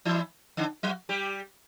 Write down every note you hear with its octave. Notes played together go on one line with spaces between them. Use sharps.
E3 E4
D3 D4
F#3 F#4
G3 G4